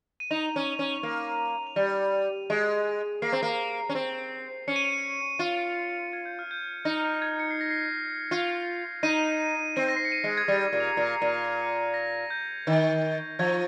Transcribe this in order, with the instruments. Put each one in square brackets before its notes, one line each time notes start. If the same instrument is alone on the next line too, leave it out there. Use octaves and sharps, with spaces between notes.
[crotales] D#7
[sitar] D#4 [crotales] F7
[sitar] C#4
C#4
A#3
[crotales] F7
[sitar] G3 [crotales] D#7
[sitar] G#3
[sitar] A#3 [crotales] C7
[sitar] C4
A#3
C#4
C4
[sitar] C#4 [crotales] C#7
[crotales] D#7
C#7
[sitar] F4 [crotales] D#7
[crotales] G#6
G6
F6
G6
[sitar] D#4 [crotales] F6
[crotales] F6
G6
G#6
C#7
C7
A#6
C7
[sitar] F4
[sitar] D#4 [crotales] D#7
[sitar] C4 [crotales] D#7
[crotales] A#6
C7
C#7
D#7
[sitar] G#3
[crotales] G#6
[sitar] G3 [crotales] A#6
[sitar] A#2
[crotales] F7
D#7
[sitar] A#2
[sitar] A#2 [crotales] D#7
[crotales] C#7
C7
C#7
A#6
G6
[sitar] D#3
[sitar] F3 [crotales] G#6